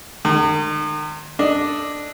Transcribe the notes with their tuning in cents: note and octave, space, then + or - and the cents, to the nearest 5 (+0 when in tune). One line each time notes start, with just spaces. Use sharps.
D#3 -45 G#3 -5
D4 +5 A4 +0 D#5 +0